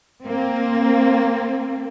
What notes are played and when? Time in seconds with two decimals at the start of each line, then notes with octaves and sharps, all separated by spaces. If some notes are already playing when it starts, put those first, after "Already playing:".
0.24 A#3 C4